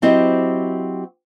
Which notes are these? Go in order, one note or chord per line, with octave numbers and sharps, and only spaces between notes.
F#3 C4 E4 G4 C5 D#5